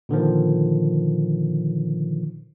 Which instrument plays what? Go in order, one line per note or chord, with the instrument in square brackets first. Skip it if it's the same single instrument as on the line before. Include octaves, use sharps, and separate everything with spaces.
[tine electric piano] A#2 D3 D#3 F3